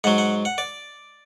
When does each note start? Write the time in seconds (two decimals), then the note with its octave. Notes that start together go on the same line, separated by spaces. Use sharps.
0.04 G#2 F#3 F#5
0.18 F#5
0.45 F#5
0.58 D5